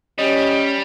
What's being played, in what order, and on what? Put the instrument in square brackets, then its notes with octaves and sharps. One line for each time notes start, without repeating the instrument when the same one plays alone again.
[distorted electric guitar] G3 [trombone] C#4 [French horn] G4 [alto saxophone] D#5